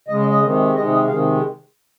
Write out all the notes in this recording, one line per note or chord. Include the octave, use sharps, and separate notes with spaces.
C#3 G#3 D#5
D#5
D#5
C3 D#3 G#3
C3 D#3 G#3 D#5
D#5
C3 D#3 G#3 F5